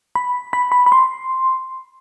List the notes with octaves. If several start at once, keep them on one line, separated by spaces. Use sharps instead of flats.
B5
B5
B5
B5
C6